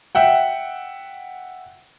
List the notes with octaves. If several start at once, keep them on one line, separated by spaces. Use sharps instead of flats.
E5 F#5 G5